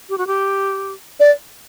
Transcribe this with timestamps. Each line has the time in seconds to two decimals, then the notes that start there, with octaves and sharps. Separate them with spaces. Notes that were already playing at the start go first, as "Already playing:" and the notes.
0.09 G4
0.18 F#4
0.27 G4
1.20 D5